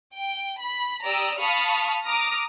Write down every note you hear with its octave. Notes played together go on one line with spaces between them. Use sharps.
G5
B5
G4 D5 A#5 D#6 E6
F5 A5 B5 C#6 D#6 F6
A#5 D6 D#6 F6 A#6